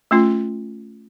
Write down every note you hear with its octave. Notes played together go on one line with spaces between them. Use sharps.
A3 C#4 F4